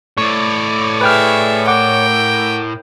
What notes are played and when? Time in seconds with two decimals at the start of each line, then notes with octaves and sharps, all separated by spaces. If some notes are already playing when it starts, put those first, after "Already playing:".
0.18 A2 C#5 D5 C#6
1.01 G#4 B4 E5 G5 F6
1.67 A#4 F#5 G5 D6